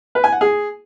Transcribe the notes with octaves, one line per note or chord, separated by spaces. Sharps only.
B4
G#5
F#5
G#4